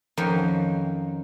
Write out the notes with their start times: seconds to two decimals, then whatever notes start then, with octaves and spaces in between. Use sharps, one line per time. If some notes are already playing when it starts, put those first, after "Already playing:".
0.17 F2 D#3 F#3 C#4 D#4 C5